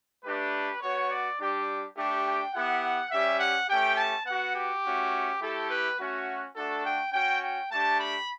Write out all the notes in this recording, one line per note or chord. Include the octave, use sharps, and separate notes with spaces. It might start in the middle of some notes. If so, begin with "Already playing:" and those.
A3 D4 G4 B4
B3 F#4 C#5
D5
G3 D4 G4
A3 D4 G4
G5
B3 E4 G4 F#5
G3 C#4 G4 E5
F#5
A3 C#4 G4 G5
A5
B3 F#4 F#5
G4
A3 C#4 F#4
A3 E4 G4 A4
B4
A3 C#4 F#4
A3 D4 F#4 A4
G5
C#4 F#4 G5
G5
A3 D4 G4 A5
B5